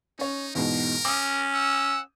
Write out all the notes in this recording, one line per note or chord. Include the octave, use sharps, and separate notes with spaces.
C#4 D#4 C#5
E2 G#2 B2 A#4
C#4 D6 D#6
F#5 E6